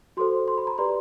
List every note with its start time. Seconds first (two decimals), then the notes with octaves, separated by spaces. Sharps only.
0.17 F#4 A4 C5 C6
0.48 C6
0.58 B5
0.67 A#5
0.78 G4 B4 D5 C6